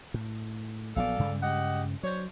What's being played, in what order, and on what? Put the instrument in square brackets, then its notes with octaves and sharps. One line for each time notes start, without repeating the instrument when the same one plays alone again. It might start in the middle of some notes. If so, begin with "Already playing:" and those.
[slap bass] A2
[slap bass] A#1 F#3 B3 [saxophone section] A4 D5 F5
[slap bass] G2 C#3 G#3
[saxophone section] G4 D#5 F#5
[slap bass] F#3 [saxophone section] D4 C5 C#5